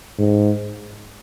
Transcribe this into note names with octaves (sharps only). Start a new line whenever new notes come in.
G#2